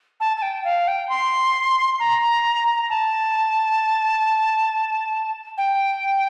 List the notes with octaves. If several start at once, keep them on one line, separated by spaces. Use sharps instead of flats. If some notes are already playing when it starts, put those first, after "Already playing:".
A5
A5
G5
F5
G5
C6
A#5
A5
G5